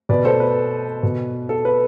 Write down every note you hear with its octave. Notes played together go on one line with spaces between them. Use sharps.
B2 B4 D5
A4 C5
B4
B2
A4
B4